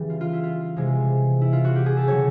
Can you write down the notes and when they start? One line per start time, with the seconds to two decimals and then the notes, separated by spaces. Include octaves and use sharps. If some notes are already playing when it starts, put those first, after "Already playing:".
Already playing: C#3 E3 G3
0.10 F4
0.21 F4
0.33 E4
0.43 F4
0.76 C3 E3 G#3
1.41 E4
1.53 F4
1.64 F#4
1.76 G4
1.86 G#4
1.97 A4
2.07 C#3 F#3 C#5